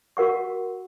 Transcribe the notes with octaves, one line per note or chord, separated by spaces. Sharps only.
F#4 A#4 F#5 C#6